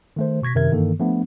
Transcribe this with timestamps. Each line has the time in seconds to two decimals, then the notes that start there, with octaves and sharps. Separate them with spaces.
0.16 D#3 A3 C5
0.42 B2 C#6 G#6 A#6 B6
0.55 F#2 C3 D#3 A#4 E5 G#6
0.71 G2 D#3 E3 A#3 A4
1.00 F3 A3 B3 D4